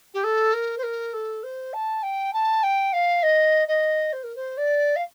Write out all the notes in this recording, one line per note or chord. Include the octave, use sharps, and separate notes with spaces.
G4
A4
A#4
C5
A#4
A4
C5
A5
G5
A5
G5
F5
D#5
D#5
C5
A#4
C5
D5
F5